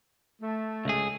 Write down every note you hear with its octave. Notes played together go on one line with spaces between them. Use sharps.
A3
C#2 G#4